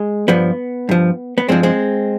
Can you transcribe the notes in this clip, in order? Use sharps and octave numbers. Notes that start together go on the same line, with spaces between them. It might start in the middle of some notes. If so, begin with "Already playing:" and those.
Already playing: G#3
G2 F3 B3
G2 F3
B3
G2 F3 G#3 C4
G#3 C4